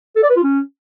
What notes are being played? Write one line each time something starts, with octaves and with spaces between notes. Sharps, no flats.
A4
D5
B4
F4
C#4